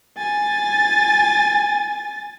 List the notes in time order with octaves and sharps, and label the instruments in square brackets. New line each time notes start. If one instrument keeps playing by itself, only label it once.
[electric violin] G#5 A6